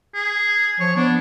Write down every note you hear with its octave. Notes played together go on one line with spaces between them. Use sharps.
G#4
F3 C#5
B3 D4